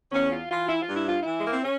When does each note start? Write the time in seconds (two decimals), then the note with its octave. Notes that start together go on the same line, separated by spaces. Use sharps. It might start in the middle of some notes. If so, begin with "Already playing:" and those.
0.12 E2 C#4
0.31 F4
0.50 E3 F4
0.69 E4
0.82 F4
0.88 G2
0.95 E4
1.08 F4
1.22 E3 E4
1.36 G#3
1.44 A#3
1.53 C4
1.63 C#4